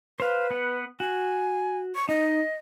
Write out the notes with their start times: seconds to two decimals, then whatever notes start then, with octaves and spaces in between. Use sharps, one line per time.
0.20 B4 C5 F5
0.51 B3 F#5
1.00 F#4 G#5
1.95 C#6
2.09 D#4 D#5